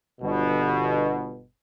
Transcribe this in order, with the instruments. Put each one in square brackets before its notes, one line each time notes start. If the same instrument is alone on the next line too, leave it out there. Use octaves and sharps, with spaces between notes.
[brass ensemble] G1 B2